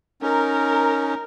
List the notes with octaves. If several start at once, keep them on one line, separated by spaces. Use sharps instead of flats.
C#4 D#4 A#4